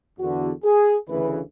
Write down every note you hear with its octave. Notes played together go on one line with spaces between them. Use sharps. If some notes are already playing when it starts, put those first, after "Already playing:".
E2 D3 F#4
G#4
D2 C#3 E3 B4